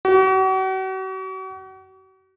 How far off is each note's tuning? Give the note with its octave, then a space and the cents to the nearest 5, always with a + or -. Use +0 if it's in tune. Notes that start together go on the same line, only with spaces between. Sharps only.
F#4 +40